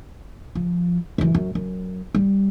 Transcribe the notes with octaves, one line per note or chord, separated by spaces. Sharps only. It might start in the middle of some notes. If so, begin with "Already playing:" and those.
F3
F#2 E3
F#2
F#2
G3